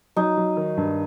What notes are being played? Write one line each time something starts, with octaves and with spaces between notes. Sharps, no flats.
F#3 D#4
F#3
D#3
G2